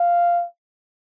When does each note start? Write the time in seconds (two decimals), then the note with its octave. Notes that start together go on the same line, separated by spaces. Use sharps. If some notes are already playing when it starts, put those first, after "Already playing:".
Already playing: F5